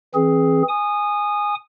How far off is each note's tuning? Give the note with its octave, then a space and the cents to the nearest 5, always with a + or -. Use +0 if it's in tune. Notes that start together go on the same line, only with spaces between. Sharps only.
E3 +0 C4 +25 G#4 +10
G#5 -5 D#6 -20